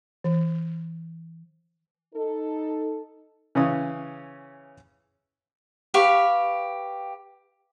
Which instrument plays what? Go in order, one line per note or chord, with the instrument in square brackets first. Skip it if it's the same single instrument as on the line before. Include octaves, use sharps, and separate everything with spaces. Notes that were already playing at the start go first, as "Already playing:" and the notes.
[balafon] E3
[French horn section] D#4 A4
[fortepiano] C#3 E3 C#4 D#6
[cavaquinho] G4 B4 F5 C#6